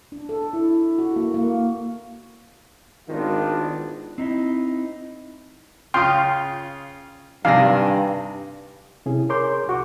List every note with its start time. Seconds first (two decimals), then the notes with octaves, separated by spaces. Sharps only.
0.12 D4
0.29 A4
0.53 E4
0.99 F#4
1.16 A#3
1.34 A#3
3.09 G#1 D#3 B3 D4 F4
4.18 C4 D#4 E4 D#5
5.94 C#3 F4 G5 C6 D#6 F6
7.45 G2 C3 D#3 D4 F5 G#5 A#6
9.06 C3 C#4 E4 G#4
9.29 G#4 A#4 C#5 C6 D6 G6
9.68 C2 F#4 C#6 D6